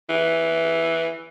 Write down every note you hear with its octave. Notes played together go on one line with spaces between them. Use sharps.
E3